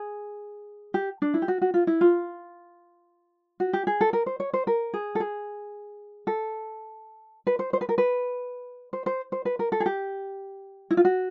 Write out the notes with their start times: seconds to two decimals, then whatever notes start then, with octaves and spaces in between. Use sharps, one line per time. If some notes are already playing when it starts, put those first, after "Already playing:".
Already playing: G#4
0.94 G4
1.22 D4
1.34 E4
1.42 G4
1.48 F#4
1.62 F#4
1.74 F4
1.87 E4
2.01 F4
3.60 F#4
3.73 G4
3.87 G#4
4.01 A4
4.13 A#4
4.26 C5
4.40 C#5
4.53 C5
4.67 A#4
4.94 G#4
5.15 A4
5.20 G#4
6.27 A4
7.47 B4
7.59 C5
7.73 C5
7.81 B4
7.89 A#4
7.98 B4
8.93 C5
9.06 C5
9.32 C5
9.45 B4
9.59 A#4
9.72 A4
9.80 G#4
9.86 G4
10.91 E4
10.97 F4
11.05 F#4